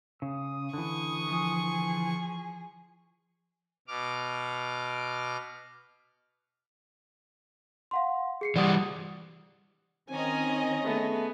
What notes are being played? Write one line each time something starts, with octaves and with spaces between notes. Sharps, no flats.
C#3 D#6
D3 E3 C#6
F3 G#4
B2 D6 F6
F5 F#5 C6
G#4 C7 C#7
E3 G3 D5 F#5 D#6
D#3 C4 C#4 D#5 G#5 A#5
A3 B3 G#4